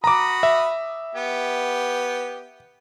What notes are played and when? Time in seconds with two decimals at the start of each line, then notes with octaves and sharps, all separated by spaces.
0.04 F#4 A#5 B5 D6 D#6
0.43 E5
1.15 B3 G4